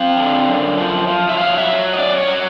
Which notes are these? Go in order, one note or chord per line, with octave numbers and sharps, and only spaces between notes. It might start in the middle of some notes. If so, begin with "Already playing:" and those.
Already playing: C4 F5
D3
F#2
F3
F3
E5
F#3 F5
E5
F#3
D#5
C#4 D5
C#5
F#3